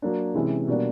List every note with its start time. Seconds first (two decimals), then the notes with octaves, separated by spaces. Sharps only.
0.02 F#3 A#3 D4
0.35 C3 E3 G#3 C#4 E4
0.68 B2 G3 A#3 D4